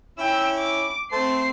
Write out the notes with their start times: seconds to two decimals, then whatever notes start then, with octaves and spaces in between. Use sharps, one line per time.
0.19 C#4 E4 G5 E6
0.59 D6
1.12 A3 C4 C5 A5 C7